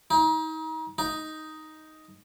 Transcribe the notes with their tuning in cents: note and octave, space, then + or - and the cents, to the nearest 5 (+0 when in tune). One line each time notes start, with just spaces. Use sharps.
D#4 +35
D#4 +5